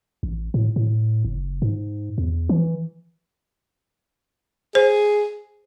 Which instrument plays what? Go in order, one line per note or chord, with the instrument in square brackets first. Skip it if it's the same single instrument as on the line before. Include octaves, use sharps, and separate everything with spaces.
[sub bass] A1
A2
A2
F#1
G#2
E2
E3
[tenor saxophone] G#4 [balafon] C5